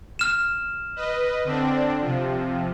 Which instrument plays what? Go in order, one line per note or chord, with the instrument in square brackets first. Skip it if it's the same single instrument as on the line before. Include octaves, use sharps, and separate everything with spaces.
[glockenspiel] F6 E7
[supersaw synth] B4 D#5
D3 C4 D4
C3 F3